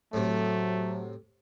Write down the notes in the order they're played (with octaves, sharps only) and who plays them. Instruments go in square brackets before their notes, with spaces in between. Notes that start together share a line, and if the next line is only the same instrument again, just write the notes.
[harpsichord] A2 C3 [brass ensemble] F#3 [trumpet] A3